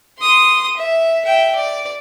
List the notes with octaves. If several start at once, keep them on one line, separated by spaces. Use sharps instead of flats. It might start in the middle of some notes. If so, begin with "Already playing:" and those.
C6 D#6
E5
E5 G5
D5